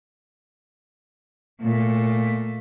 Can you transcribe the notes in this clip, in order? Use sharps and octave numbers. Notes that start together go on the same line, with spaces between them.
A#2 A3